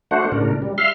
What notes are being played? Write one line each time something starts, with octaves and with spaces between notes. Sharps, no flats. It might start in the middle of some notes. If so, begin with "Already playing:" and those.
A3 D4 F#4 C5 F#5
A2 C#3 D4 A#4
G3
E5 F5 C6 F6